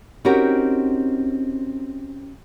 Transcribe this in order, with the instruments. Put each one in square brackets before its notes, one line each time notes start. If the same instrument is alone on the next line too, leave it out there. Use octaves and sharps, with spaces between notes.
[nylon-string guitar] C4 C#4 D#4 F#4 G4 A#4